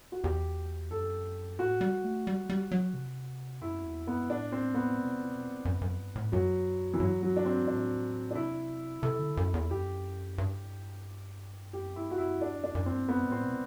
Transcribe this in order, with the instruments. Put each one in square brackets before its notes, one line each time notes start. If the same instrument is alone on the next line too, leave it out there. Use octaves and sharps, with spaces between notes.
[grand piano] F#4
[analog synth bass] E2 [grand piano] G4
[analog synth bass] F#2 [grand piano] A4
[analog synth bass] A2 [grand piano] F#4
[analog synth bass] G3
A3
G3
G3
F#3
C3
[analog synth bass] F#2 [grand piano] E4
[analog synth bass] E2
[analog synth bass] F#2 [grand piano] B3
[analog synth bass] A2 [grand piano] D4
[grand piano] C4
B3
[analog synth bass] B2
C3
B2
F#2
F#2
G2
A2
[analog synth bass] F#2 [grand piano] F#3
[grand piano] E3
[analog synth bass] G2 [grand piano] F#3
[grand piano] F#3
D4
C4
[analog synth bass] A2 [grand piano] D4
[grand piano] D4
[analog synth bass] C3 [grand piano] E4
[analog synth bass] C3 [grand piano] A4
[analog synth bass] D3
F#2
E2
[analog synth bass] F#2 [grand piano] G4
[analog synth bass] G2
[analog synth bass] F#2 [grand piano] G4
[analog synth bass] G2 [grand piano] E4
[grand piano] F#4
[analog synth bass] F#2 [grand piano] E4
[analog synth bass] G2 [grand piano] D4
[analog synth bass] F#2
[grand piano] D4
[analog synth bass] F#2
[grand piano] C4
[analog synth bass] G2
[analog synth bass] F#2 [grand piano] B3
[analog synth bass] A2
[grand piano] C4
[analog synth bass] B2